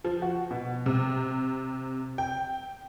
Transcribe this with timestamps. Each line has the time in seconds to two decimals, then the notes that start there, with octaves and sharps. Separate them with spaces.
0.04 F3
0.22 F#4
0.51 B2
0.86 C3
2.18 G5